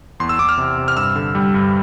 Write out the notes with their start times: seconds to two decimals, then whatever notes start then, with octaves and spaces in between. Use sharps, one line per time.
0.20 E2 C6
0.29 E6
0.39 E2 D6
0.49 F6
0.58 C3
0.77 C3
0.88 F6
0.97 G2 E6
1.15 D3
1.35 G3
1.54 G2